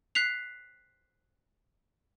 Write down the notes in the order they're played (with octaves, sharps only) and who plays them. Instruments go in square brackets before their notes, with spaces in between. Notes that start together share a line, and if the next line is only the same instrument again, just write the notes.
[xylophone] F#6 B6 C7 F7